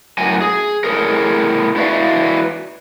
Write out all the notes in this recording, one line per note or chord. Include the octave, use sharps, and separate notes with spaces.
F#2 A2 F#4 G#5
G#4
A2 G#4 A#4
E4 F#4 B4 D5 E5 F5